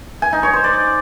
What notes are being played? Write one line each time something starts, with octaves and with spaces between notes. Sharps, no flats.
G#5
D#4
C#5
C5
D5